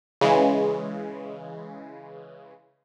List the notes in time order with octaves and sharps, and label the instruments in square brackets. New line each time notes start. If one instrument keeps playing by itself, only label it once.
[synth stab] C#3 E3 G#3